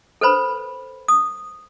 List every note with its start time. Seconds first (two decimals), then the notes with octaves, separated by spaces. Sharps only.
0.21 A4 B4 C5 B5
1.08 D#6